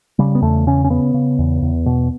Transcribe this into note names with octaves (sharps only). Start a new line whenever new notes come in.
C#3 G3
B3
E2 A3
C#3 C#4
C#4
C#3 B3
C#3
E2
E2
B2